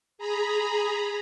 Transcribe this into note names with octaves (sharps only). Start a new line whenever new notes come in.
G#4 A#5 B5